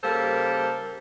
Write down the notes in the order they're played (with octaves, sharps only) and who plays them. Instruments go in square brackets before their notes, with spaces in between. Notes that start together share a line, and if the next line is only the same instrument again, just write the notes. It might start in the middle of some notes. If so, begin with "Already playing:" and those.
[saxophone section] C#3 G3 A#3 A4 A#4 C5